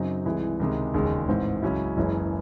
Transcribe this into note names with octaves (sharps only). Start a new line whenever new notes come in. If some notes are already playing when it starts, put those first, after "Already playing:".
Already playing: F#2 C#3 F#3 C4 D#4
C2 C3 E3 G#3
C#2 C3 D#3 G#3
E1 D#2 C#3 G#3
A1 G#2 E3 C4
C#2 C#3 F#3 C#4 E4
F#1 F#2 E3 G#3 C#4